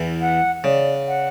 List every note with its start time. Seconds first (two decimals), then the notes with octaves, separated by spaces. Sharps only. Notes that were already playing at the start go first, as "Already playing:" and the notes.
Already playing: E2 E3
0.20 F#5
0.64 C#3 D5
1.07 F#5